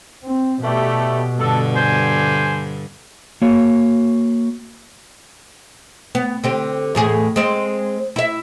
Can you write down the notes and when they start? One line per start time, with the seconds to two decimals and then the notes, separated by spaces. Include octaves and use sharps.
0.24 C4
0.63 B2 E3 G3 A3 G4
1.38 G2 D3 A4
1.75 C5 G#5
3.42 A#3 F#4 C#5
6.15 B3
6.44 D3 C4 G4
6.95 E2 A2 G#4
7.36 G#3 C4
8.16 E4 E5